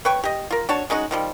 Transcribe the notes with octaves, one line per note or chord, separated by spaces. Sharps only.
B4 C#5 G5 C#6
G4 D#5
F4 A#4
D4 F#4 C#5 A5
G#3 C#4 D#4 F#4
D#3 F3 G3